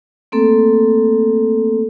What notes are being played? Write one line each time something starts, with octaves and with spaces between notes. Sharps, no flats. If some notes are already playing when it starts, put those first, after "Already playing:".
A3 A#3 C4 A4